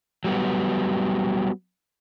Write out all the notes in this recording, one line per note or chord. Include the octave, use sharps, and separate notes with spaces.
F#3 G3 B3